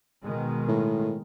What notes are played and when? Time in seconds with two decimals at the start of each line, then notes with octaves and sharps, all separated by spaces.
0.22 B2 D#3 G#3
0.68 A2